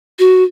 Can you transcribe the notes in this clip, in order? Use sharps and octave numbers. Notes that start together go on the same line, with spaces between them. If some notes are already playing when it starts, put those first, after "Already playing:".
F#4